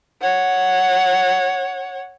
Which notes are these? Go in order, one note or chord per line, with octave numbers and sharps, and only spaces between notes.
C#5 F#5